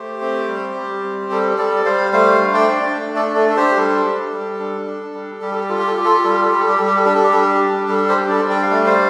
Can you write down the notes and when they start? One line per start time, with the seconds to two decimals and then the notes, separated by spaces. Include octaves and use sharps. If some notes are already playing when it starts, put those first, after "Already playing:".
Already playing: A3 G4 C5
0.21 C4
0.48 G3
0.76 G3
1.04 C4
1.31 G3 A4
1.58 G3 A4 D5
1.85 G3 C5 F5
2.13 A3 C5 F5
2.40 D4
2.54 D5 G5
2.68 D4
2.95 A3
3.16 A4 D5
3.23 D4
3.36 A4
3.49 D4 A4
3.57 G4 C5
3.77 G3 A4
4.05 G3
4.33 G3
4.60 D4
4.87 D4
5.14 G3
5.41 G3 G4
5.51 A4
5.60 G4
5.69 F4 A4
5.79 G4
5.87 A4
5.97 F4 G4
6.05 A4
6.15 G4
6.24 G3 A4
6.32 G4
6.42 A4
6.51 G3 G4
6.60 A4
6.69 G4
6.78 G3 A4
6.87 G4
6.96 A4
7.05 D4 G4
7.15 A4
7.24 G4
7.32 G3 A4
7.42 G4
7.61 D4
7.89 G3 A4
8.09 G4 C5
8.16 D4
8.30 A4 D5
8.43 G3
8.50 G5
8.63 F5
8.71 A3 D5
8.86 C5 F5